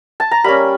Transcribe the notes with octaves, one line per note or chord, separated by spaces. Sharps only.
A5
A#5
G3 A#3 C#4 B5